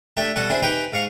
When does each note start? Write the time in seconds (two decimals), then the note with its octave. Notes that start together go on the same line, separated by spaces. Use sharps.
0.17 A3 D4 G4 E5
0.36 B2 G3 F#4 A4 F#5
0.50 C4 D4 E4 G#4
0.62 D#4 G4 B4 G5 G#5 B5
0.93 G#2 F5 C#6 D#6